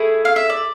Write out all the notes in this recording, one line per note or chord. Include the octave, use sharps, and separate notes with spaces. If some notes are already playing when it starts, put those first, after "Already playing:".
Already playing: A3 E4 G#4
F5
E5
D5